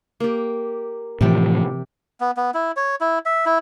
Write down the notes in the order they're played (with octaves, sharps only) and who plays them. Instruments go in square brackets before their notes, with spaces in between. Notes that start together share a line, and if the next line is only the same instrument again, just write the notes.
[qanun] A#3 G4
[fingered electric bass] A2 E3 F3 [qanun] C3 G4 D5
[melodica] B3
B3
E4
C#5
E4
E5
E4